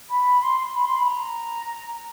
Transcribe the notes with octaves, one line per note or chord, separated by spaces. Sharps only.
B5
C6
B5
C6
B5
A#5